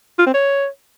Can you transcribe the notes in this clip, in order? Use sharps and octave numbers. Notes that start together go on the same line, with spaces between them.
F4
C4
C#5